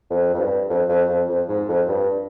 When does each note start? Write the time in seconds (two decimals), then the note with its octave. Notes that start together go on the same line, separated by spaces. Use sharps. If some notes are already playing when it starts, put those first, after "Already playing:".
0.10 F2
0.34 F2
0.40 G2
0.70 F2
0.89 F2
1.09 F2
1.28 F2
1.48 G#2
1.68 F2
1.88 G2